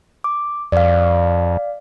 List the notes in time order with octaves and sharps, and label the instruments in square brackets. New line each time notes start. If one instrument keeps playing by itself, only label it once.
[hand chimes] D6
[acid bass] F2 [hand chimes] D5 F5